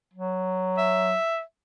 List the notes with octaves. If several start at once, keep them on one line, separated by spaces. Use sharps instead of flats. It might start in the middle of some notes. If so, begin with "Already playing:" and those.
F#3
E5